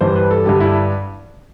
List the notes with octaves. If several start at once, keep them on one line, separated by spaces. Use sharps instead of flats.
G2 E3 G3 C5
B4
A4
G2 D3 G3 G4
E4